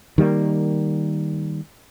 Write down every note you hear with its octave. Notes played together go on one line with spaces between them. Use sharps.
D#3 G3 G#3 A#3